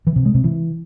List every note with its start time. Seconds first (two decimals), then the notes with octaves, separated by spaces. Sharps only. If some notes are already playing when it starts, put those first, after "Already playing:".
0.07 E3
0.16 C3
0.25 G#3
0.35 C3
0.44 E3